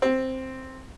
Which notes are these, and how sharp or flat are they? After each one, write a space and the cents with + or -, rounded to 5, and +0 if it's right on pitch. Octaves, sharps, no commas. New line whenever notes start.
C4 +0